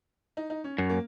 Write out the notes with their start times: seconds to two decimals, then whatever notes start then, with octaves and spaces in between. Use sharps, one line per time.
0.37 D#4
0.50 D#4
0.64 C#4
0.78 F#2 C#4
0.90 A#3